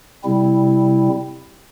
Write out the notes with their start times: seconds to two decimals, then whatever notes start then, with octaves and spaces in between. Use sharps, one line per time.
0.24 C3 G3 C4 E4